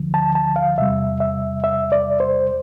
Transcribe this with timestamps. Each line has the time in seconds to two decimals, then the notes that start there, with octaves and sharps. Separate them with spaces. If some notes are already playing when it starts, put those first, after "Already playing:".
Already playing: D2 D3 F3
0.14 A5
0.35 A5
0.56 F5
0.78 E2 C3 G3 E5
1.20 E5
1.64 E5
1.92 D5
2.20 C5